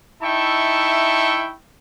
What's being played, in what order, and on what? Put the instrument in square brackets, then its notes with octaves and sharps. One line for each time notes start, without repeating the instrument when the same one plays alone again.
[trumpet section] D#4 E4 E5 G5 A5 C#6